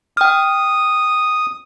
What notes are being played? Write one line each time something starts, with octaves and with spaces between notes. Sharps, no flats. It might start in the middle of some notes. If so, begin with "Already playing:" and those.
G5 D#6 F6